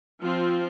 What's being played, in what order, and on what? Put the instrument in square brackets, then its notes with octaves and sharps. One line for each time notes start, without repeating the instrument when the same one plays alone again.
[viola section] F3 C4 F4